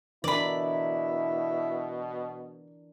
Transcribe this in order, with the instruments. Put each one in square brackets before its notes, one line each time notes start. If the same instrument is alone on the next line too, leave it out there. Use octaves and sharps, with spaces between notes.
[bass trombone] B2 [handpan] E3 D4 A#4 [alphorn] E4 [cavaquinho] D5 B5